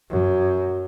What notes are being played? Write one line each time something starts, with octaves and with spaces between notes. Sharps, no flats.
F#2